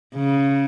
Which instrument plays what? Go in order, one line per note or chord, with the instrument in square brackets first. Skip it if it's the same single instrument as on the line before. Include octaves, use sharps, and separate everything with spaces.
[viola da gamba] C#3